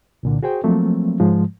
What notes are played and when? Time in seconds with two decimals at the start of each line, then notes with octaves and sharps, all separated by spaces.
0.23 C2 A#2 D3
0.43 F#4 G#4 C5 G5
0.64 F3 F#3 A3 A#3 C4
1.20 G#2 F3 G#3